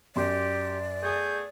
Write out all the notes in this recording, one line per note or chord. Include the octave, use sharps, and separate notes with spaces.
F#2 G4 D5 C6
A3 B3 G#4 G6